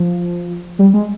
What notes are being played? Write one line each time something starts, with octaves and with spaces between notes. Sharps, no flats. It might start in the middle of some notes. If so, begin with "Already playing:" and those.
Already playing: F3
G3
G#3